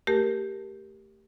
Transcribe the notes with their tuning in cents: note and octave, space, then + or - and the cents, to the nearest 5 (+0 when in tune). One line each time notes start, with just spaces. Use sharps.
A3 +10 G4 +0 A#4 +0